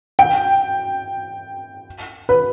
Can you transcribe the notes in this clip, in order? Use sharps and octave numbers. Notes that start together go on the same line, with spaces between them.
G5
B4